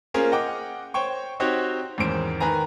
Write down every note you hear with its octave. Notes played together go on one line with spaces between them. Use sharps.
A#3 C#4 F4 G#4 A#4 C5
D#5 F#5 G5 D6
C5 C#5 G5 C#6
C4 D#4 F#4 G4 C#5
E2 G#2 D#3 C#4 C5 D7
D#3 B4 G#5 A#5